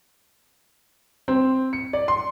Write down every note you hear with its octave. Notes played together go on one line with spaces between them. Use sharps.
C4
C#7
D5
C6